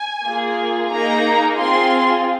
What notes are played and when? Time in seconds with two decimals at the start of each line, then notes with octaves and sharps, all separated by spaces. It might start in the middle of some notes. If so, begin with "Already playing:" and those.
Already playing: G#5
0.26 A#3 F4 G#4
0.92 A#3 D#4 G#4 A#5
1.58 C4 F4 G#4 C6